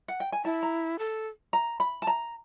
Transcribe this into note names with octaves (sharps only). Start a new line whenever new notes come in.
F#5
G5
G#5
E4 A5
A#5
A4
A#5
B5
A5
A#5